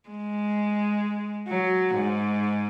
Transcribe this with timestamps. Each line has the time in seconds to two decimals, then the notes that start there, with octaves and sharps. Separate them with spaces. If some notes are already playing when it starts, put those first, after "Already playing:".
0.09 G#3
1.48 F#3
1.95 G#2